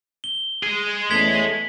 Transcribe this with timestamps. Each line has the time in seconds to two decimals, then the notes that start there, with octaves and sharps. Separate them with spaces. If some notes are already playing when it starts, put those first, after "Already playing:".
0.24 G7
0.63 G#3 G#4
1.11 E2 A3 C#4 G#6 B6 F#7